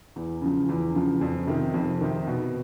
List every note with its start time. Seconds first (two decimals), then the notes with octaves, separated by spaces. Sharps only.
0.16 E2
0.41 C#3 F3
0.69 E2
0.95 C#3 F3
1.21 F2
1.47 C3 D#3
1.74 F2
2.01 C3 D#3
2.27 B2